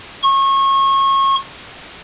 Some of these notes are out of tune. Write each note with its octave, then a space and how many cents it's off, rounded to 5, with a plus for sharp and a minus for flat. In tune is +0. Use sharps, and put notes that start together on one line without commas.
C#6 -30